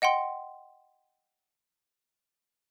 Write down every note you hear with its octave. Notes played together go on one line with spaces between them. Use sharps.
D#5 F#5 G5 C6